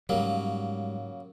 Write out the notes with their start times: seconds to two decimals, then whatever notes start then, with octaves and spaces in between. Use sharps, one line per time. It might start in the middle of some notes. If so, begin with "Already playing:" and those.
0.09 G#2 C#3 F#3 G3 A#3